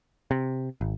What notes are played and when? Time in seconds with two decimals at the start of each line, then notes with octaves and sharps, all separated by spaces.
0.31 C3
0.81 G#1